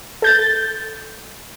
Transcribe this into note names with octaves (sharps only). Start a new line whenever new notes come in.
A4 G6 A6